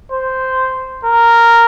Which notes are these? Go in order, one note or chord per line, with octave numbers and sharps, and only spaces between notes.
C5
A#4